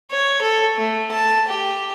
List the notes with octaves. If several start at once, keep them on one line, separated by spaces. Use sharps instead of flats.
C#5
A4
A3
A5
G4